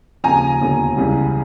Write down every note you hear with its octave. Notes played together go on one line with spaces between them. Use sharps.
D#2 C#3 F3 G#5 A#5
E1 D#2 D3 F3
C#2 C#3 E3 G3